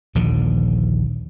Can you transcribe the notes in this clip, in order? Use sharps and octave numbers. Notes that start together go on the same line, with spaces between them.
A#1 D#2 D3 F3